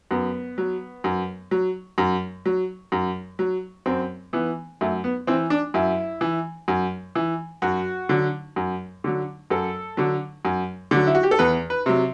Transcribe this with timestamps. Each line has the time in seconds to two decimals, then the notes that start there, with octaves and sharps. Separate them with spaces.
0.11 F#2 B3
0.58 F#3
1.04 F#2
1.51 F#3
1.98 F#2
2.46 F#3
2.92 F#2
3.39 F#3
3.86 F#2 C4
4.33 E3 B3
4.81 F#2 A3
5.04 B3
5.27 E3 C4
5.50 D4
5.74 F#2 E4
6.21 E3
6.68 F#2
7.15 E3
7.62 F#2 F#4
8.09 D3 F#3
8.56 F#2
9.04 D3 F#3
9.50 F#2 A4
9.97 D3 F#3
10.45 F#2
10.91 D3 F#3
11.07 E4
11.15 F#4
11.23 G4
11.31 A4
11.39 E2 B4
11.70 B4
11.86 C3 F#3